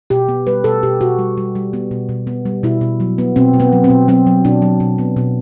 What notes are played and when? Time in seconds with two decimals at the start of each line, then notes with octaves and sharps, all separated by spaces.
0.10 B2 G4
0.28 B3
0.47 G3 B4
0.64 B2 A4
0.83 B2 G4
1.01 B2 F#4
1.19 G3
1.37 G3
1.55 G3
1.73 B3
1.91 B2
2.09 B2
2.27 B3
2.46 G3
2.63 B2 E4
2.81 B2
3.00 F#3
3.18 B3
3.36 B2 C4
3.54 B2
3.60 B3
3.72 F#3
3.84 C4
3.90 B2
4.08 F#3 C4
4.27 F#3
4.45 B2 D4
4.62 F#3
4.80 B2
4.98 B3
5.17 B2